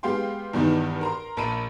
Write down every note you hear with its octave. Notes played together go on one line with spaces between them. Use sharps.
G#3 B3 G4 F5 G5 C6
E2 G2 D#3 B3 D#4
A#4 A#5 C6
A#1 A#4 A5 B5 D7 D#7